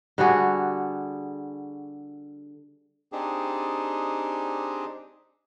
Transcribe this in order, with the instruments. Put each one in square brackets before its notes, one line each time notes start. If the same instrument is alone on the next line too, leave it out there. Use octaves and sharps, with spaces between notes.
[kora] D3 G3 F#4 G#4
[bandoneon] C4 D4 D#4 G4 G#4